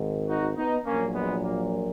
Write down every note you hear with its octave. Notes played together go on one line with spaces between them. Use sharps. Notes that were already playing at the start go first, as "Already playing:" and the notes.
Already playing: G#1 G#2 D#3
D#4 F#4
B3 D#4
A#1 A#2 F#3 A#3 C#4
G#3 B3
A#3